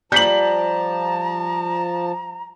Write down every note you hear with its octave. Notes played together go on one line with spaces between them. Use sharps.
F3 G3 A5 A#5 G6 B6 F#7